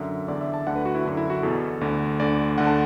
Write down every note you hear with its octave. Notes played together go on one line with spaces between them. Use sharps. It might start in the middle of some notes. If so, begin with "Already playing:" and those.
Already playing: F#2 D3 E5
E2 D3 D5
E5
A5
D2 D3 F#5
B4
F#4
E4
F#2 D3 D4
E4
F#4
E2 B2 A4
D2 D3
D2 D3 D5
D2 D3 F#5
A5